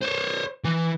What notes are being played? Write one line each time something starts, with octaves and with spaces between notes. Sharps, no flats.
C5 C#5
E3